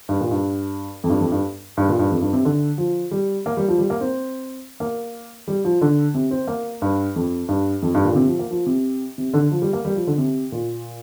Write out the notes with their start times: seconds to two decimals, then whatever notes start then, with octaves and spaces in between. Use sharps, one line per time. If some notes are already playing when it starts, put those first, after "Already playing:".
0.09 G2
0.21 A#2
0.31 G2
1.04 F2
1.10 G2
1.21 F2
1.32 G2
1.77 G2
1.89 A#2
1.99 G2
2.11 F2
2.22 G2
2.33 C3
2.45 D3
2.78 F3
3.11 G3
3.46 A#3
3.57 G3
3.68 F3
3.78 G3
3.90 A#3
4.01 C4
4.80 A#3
5.48 G3
5.65 F3
5.81 D3
6.14 C3
6.31 C4
6.47 A#3
6.82 G2
7.16 F2
7.48 G2
7.82 F2
7.94 G2
8.04 A#2
8.12 D3
8.16 C3
8.27 F3
8.39 A#3
8.51 F3
8.66 C3
9.18 C3
9.33 D3
9.51 F3
9.62 G3
9.73 A#3
9.85 G3
9.96 F3
10.07 D3
10.18 C3
10.52 A#2